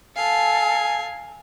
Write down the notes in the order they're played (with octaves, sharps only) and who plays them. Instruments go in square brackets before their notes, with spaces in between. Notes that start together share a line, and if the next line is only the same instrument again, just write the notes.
[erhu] A4 [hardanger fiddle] F5 [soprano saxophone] G#5